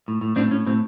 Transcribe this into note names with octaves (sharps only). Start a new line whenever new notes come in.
A2
A2
A2 C4 D4
A2 C#4
A2 C4